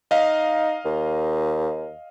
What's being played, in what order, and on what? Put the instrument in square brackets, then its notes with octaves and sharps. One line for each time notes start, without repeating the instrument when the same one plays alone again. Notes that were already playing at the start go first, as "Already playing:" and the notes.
[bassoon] D#4 [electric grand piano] D#5 F5
[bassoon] D#2